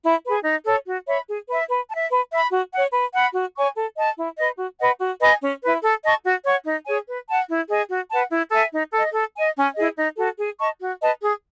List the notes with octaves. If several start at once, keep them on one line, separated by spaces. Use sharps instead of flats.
E4
G#4 B4
D#4
A4 C#5
F#4
C#5 E5 B5
G#4
B4 E5
B4
A5
E5
B4
E5 B5
F#4
C#5 F#5
B4
F#5 B5
F#4
C#5 G#5 C#6
A4
D#5 A5
E4
B4 D#5
F#4
B4 D#5 F#5
F#4
B4 D#5 G#5
C#4
E4 B4
A4
D#5 A5 C#6
F#4
C#5 F#5 C#6
D#4
G#4 C#5 G#5
B4
F#5 A5
E4
G#4 D#5 G#5
F#4
B4 F#5 A5
E4
A4 E5 G#5
D#4
A4 D#5
A4
D#5 G#5
C#4
E4 G#4 D#5
D#4
F#4 A4
G#4
D#5 A5 C#6
F#4
B4 D#5 A5
G#4